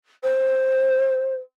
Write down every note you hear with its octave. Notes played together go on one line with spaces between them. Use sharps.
C5